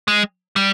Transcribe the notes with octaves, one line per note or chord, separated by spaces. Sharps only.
G#3
G3